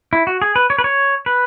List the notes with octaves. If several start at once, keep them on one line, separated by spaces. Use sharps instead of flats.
E4
F#4
G#4
B4
C#5
B4
C#5
B4